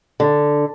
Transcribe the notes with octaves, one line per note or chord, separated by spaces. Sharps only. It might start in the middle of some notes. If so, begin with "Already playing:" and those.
D3